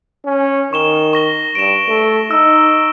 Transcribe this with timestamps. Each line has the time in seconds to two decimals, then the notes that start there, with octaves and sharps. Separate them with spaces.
0.25 C#4
0.73 D#3 C#6 E7 G7
1.13 C#6 A#6 G7
1.55 G2 D7 E7
1.88 A3
2.31 D#4 E6